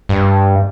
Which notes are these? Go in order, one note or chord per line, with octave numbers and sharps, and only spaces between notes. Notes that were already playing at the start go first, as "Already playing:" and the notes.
G2